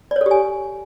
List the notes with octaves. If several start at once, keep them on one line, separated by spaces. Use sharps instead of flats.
G4 A4 C#5 D5 G#5